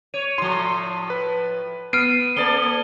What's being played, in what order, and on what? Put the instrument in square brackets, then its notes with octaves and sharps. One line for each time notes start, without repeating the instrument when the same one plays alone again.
[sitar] C#5 [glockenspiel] D#7
[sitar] A2 F3 [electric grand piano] C6
[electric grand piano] B4
[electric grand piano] B3 C7 D7 [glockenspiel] F6 D#7
[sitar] A#3 A4 D5 [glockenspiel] G7